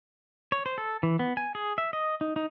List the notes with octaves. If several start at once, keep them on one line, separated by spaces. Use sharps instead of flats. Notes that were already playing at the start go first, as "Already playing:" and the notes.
C#5
C5
A4
E3
B3
G#5
G#4
E5
D#5
D#4
D#4